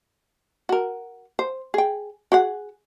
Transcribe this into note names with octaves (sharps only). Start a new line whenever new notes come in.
F#4 A#4
C5
G#4 G5
F#4 G#4 F#5